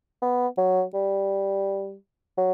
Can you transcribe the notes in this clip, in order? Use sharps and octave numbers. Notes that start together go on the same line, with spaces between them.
B3
F#3
G3
F#3